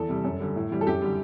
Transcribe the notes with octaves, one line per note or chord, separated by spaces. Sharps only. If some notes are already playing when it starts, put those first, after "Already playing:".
Already playing: E2 A4
C3 G3
F#2
D3 G3
A2
E3 G3
A4
F#2 G4
D3 G3